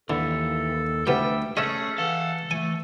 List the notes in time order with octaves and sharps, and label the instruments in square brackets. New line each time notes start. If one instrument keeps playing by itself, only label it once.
[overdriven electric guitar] D#2 [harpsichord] D3 [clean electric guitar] E3 [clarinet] A4
[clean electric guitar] D2 G3 [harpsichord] C3 E3 B3 [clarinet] E5 [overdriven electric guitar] G5
[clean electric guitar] A3 C#4 [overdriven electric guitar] G#4 [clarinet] A4 [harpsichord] D#5 E5
[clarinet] E3 [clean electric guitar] A4 [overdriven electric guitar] F5 F#5
[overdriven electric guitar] E3 [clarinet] A3 [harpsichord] G#5